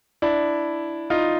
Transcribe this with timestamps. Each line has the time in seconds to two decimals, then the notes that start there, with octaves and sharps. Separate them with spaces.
0.22 D4 E4
1.10 D#4 F4